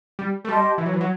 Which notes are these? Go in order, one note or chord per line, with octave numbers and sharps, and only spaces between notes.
G3
A3
G3 G4 D#5 A5 C6
E3
F#3
E3
F#3